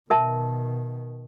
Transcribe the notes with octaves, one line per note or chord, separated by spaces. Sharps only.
B2 D#3 A#4 E5 A5